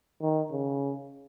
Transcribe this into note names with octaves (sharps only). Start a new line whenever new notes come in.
D#3
C#3